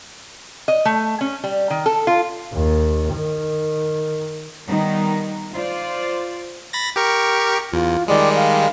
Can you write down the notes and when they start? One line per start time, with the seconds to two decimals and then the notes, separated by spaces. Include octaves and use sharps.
0.68 D#5
0.85 A3
1.21 C#4
1.44 G3
1.70 D#3
1.86 A4
2.07 F4
2.53 D#2
3.15 D#3
4.68 D#3 G3 B3 D#4
5.53 F4 C5 D5
6.73 B5 A6 A#6
6.96 G4 A#4 C#6
7.73 E2 F4
8.08 D#3 G3 G#3 D5
8.36 F5